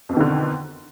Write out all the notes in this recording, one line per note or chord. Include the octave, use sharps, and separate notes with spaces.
F2 B2 D3 D#3